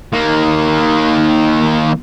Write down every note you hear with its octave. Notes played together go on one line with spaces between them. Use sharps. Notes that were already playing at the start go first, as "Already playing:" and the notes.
D#3 A#3